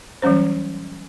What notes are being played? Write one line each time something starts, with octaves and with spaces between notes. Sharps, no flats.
E3 F#3 G3 C#4 C5